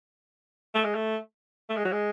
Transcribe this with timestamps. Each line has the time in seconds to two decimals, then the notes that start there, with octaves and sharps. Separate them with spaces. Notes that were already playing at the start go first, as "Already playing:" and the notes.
0.74 A3
0.84 G#3
0.94 A3
1.69 A3
1.77 G#3
1.85 F#3
1.92 G#3